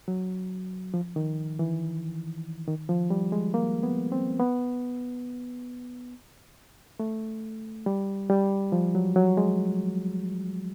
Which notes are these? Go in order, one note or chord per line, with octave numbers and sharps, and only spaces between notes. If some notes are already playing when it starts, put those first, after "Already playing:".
F#3
F3
D#3
E3
D#3
F3
G3
G#3
A#3
B3
C4
B3
A3
G3
G3
F3
F#3
F#3
G#3